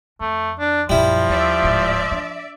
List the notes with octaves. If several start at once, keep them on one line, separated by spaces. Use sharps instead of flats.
F2 A3
D4
A#1 F#2 F3 G3 E4
D#2 D5 E5
D1 G#2
D4